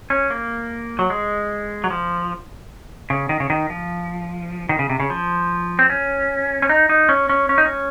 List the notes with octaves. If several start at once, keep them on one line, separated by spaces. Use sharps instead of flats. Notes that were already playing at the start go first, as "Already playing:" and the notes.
C#4
A#3
F#3
G#3
F#3
F3
C#3
D#3
C#3
D#3
F3
D#3
C#3
C3
C#3
F3
C4
C#4
C#4
D#4
D#4
C#4
C#4
C#4
D#4
C#4